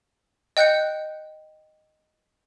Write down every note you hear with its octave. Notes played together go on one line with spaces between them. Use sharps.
D#5 G5 F#6 G6 C#7